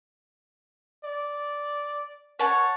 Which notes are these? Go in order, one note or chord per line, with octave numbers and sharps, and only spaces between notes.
D5
C#5 F#5 A5